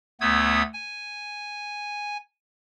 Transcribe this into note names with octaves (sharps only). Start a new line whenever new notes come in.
D2 A3 B3 D#6 E6 G#6
G#5